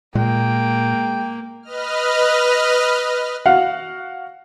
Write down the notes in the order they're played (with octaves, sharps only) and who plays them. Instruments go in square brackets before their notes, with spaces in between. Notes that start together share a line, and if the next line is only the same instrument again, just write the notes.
[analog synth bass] A#2 [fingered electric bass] G#3 [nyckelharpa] A#3 [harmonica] G5
[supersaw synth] B4 D#5 F6
[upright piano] F#4 F5 F#5